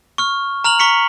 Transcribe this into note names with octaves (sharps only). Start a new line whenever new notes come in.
C#6 F6
A#5 F6 F7 F#7
A#5 C#6 B6 C#7